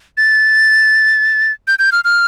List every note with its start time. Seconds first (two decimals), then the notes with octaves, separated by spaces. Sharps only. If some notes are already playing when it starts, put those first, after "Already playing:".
0.17 A6
1.68 G6
1.79 G6
1.92 F6
2.04 F6